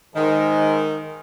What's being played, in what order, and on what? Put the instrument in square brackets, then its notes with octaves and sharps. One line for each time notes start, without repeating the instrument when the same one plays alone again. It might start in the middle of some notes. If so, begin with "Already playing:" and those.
[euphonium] G#2 [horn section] D#3 [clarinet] D#5